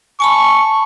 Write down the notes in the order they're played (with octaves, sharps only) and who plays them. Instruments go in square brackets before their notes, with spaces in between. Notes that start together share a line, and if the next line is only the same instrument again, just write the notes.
[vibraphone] G#5 A5 B5 [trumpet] C#6